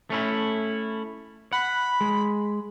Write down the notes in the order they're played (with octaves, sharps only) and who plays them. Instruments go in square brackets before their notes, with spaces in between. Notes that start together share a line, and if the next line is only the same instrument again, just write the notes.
[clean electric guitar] A3 C#4 E4
[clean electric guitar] F#5 [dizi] B5
[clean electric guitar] G#3